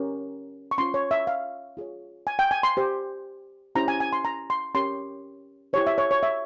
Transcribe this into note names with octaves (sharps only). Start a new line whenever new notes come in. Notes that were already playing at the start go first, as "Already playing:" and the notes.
Already playing: C#4 G4 A#4
C#6
C#4 F4 C5 C6
C#5
E5
F5
F4 G#4 C#5
G#5
G5
G#5
C6
G4 C5
C#4 E4 G4 C5 A#5
G#5
G#5
C6
A#5
C6
C#4 G4 A#4 C#5 C6
E4 G4 C5 C#5
E5
C#5
C#5
E5